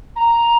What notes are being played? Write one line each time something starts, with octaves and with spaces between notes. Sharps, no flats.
A#5